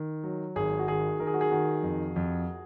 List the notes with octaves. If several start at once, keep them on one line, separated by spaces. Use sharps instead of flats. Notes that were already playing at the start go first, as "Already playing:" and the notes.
Already playing: D#3
F#3
G#1 G#4
F#4
D#3 G#4
D#3 A#4
G#4
F#4
G#4
D#3 F#4
F2
F2